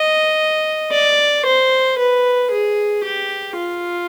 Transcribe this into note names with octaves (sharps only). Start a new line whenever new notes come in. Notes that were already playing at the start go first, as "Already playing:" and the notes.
Already playing: D#5
D5
C5
B4
G#4
G4
F4